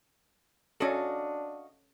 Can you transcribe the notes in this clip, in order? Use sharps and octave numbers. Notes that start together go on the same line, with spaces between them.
C#4 D4 F#4 A4 D#5 F5